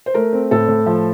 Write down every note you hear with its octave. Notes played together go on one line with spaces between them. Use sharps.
C5
A3 A#4
C4
A2 A4
A2
F3